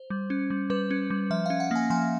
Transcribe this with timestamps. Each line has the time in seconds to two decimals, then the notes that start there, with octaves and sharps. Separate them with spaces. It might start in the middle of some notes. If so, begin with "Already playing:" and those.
Already playing: C5
0.10 G3
0.30 C#4
0.50 G3
0.70 G3 B4
0.91 C#4
1.10 G3
1.30 F3 E5
1.46 C#4 F5
1.60 F#5
1.71 A#3 G#5
1.90 F3 G#5